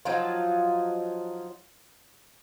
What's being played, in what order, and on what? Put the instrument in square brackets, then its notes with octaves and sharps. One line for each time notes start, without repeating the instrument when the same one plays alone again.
[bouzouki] F3 F#3 D#4 F4